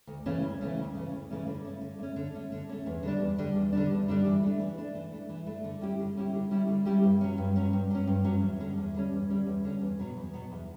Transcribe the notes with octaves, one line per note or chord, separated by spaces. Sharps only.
D2
C#3 E3 A3 C#4
D2
C#3 E3 A3 C#4
D2
C#3 E3 A3 C#4
D2
C#3 E3 A3 C#4
D3
A3 C#4
D3
A3 C#4
D3
A3 C#4
D3
A3 C#4
E2
D3 G3 D4
E2
D3 G3 D4
E2
D3 G3 D4
E2
D3 G3 D4
E3
A3 D4
E3
A3 D4
E3
A3 D4
E3
A3 D4
D3
G3 C#4 E4 G4
D3
G3 C#4 E4 G4
D3
G3 C#4 E4 G4
D3
G3 C#4 E4 G4
G2
F#3 C#4
G2
F#3 C#4
G2
F#3 C#4
G2
F#3 C#4
E2
D3 G3 C#4
E2
D3 G3 C#4
E2
D3 G3 C#4
E2
D3 G3 C#4
E2
B2 F#3 B3
E2
B2 F#3 B3
E2